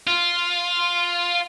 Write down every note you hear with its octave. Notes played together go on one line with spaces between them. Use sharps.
F4